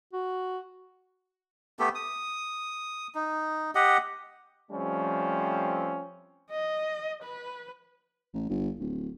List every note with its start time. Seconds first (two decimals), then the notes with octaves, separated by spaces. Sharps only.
0.13 F#4
1.79 A3 B3 G4 A4
1.95 D#6
3.15 D#4
3.75 G4 D#5 F#5
4.71 F3 G3 A3 C4 C#4
6.51 D#5
7.23 B4
8.34 A1
8.49 G1
8.80 D1